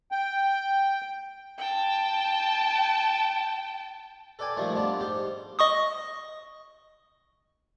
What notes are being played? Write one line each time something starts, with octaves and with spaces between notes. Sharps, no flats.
G5
G5 A5
A4 B4 D5 G5 G#5
A#2 D#3 F3 G3 A3 A#3
G2 B3 D4 F4 B4 A5
G#2 G4 C5
D#5 C#6 D#6